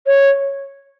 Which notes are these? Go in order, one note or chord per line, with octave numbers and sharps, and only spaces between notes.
C#5